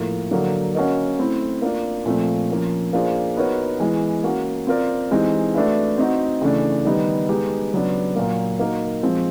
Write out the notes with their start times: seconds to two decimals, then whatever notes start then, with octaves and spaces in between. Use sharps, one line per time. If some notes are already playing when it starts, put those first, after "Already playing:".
Already playing: A2 F3 A#3
0.31 D3 F#3 A#3 D4 F#4
0.75 A#3 C#4 F#4 A#4 D#5
1.19 A3 C4 E4
1.62 A#3 D4 F4
2.06 A#2 F3 A3 C4
2.50 F3 A#3 C#4
2.93 A#3 D4 F4 G#4 C5
3.37 B3 D#4 F#4 A#4 C#5
3.80 E3 G#3 B3
4.24 A#3 C#4 F#4
4.67 C4 F4 A#4 D5
5.11 E3 G#3 C4 D#4 G4
5.54 A3 D4 F#4 B4 E5
5.98 C4 D#4 F#4
6.41 C#3 E3 A3 D4
6.85 D#3 G3 B3 D#4 G4
7.29 G#3 B3 D#4 G4
7.73 C#3 F#3 B3 D4
8.16 A#2 F#3 A#3
8.59 A#3 D#4 F#4 A#4
9.03 F3 G#3 C4